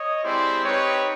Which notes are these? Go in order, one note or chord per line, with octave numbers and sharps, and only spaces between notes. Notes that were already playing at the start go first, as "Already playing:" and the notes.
Already playing: C#5 D#5
G#3 C4 E4 G4 C5 D5
C4 D#4 G4 B4 C#5